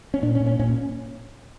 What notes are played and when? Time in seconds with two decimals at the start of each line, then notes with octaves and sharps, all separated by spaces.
0.14 C#4
0.22 A#2 D4
0.35 C#4
0.40 A#2
0.46 C#4
0.59 A#2 C#4